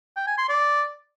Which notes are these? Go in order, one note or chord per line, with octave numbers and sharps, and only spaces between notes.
G5
G#5
C6
D5